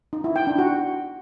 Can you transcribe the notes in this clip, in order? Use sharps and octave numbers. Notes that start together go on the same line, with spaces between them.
D#4
E4
G5
D4
F#4